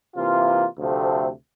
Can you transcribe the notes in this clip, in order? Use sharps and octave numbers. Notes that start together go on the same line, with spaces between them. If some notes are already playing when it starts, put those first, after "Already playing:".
C3 E3 A#3 F4
D2 C3 F3 A3 C4